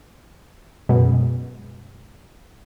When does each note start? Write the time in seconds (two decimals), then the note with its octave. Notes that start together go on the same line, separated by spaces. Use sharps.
0.89 F#2 B2 G#3